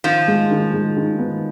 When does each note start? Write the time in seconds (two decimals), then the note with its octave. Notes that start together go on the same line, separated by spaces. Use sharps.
0.04 D#3 F3
0.28 G#3
0.51 D#3
0.73 G#3
0.97 D#3
1.19 B3